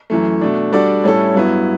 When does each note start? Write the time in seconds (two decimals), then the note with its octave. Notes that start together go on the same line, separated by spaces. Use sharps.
0.10 F#2 E3 A3
0.41 B2 A3 D4
0.72 G3 D4 F#4 A4 D5
1.04 A2 G3 C#4 E4 A4
1.34 G2 F#3 B3 E4